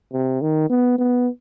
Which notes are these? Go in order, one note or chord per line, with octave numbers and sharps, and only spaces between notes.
C3
D#3
B3
B3